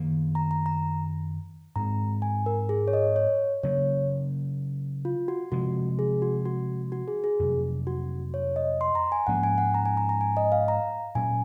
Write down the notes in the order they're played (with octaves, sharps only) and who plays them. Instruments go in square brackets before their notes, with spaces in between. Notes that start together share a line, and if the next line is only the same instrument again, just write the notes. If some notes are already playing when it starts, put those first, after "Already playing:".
Already playing: [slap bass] F#2 D#3 A#3
[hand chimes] A#5
A#5
A#5
[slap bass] G#2 F3 G#3 C4 [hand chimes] A#5
[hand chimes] G#5
A#4
G#4
C#5
D#5
C#5
[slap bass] C#3 F#3 A#3 [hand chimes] C#5
[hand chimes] F4
F#4
[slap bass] C3 F3 G#3 [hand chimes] F#4
[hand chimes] G#4
F#4
F#4
F#4
G#4
G#4
[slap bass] F2 C3 F#3
[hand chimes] F#4
C#5
D#5
C6
A#5
G#5
[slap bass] G#2 F3 A#3 C#4 [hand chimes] F#5
[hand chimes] G#5
F#5
A#5
G#5
A#5
A#5
G#5
D#5
F5
A#5
[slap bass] A#2 F#3 C#4 [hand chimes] G#5